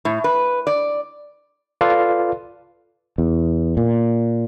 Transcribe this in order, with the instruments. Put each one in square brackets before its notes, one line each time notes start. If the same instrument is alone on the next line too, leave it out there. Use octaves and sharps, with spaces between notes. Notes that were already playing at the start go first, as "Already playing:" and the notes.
[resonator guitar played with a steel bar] A2
B4
D5
[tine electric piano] F4 A4 B4 D5 F5
[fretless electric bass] E2
A#2